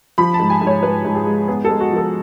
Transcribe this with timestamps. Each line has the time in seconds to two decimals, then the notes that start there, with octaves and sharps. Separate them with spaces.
0.18 F3 B5
0.34 A5
0.39 G#2
0.50 G#5
0.61 G#2
0.67 C#5
0.83 G#2 B4
1.05 G#2
1.15 G#4
1.26 G#3
1.48 B3 G#4
1.64 G#3 A4
1.80 F#4
1.91 F3
1.96 A4